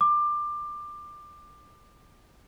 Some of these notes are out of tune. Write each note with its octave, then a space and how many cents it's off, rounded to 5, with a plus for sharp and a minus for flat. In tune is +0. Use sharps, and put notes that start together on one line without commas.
D6 +20